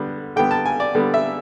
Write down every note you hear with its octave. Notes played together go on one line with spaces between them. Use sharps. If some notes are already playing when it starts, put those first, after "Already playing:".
Already playing: D3 G3 B3
D3 G3 B3 G5
A5
G#5
D5
D3 G3 B3
E5